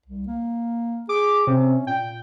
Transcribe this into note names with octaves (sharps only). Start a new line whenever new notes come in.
C2
A#3
G#4 D6
C3 C#4
A#2 G5